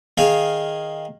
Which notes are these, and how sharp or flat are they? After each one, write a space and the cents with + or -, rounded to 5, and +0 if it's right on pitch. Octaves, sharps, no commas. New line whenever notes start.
D#3 +0 G#4 +0 F5 +0